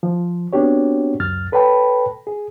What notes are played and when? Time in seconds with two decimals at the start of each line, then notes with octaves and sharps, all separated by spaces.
0.03 F3
0.53 B3 C4 D4 F#4 G4 C#5
1.20 C#2 F#2 F6 A6
1.52 A4 B4 C#5 G5 A5 B5
2.27 G#4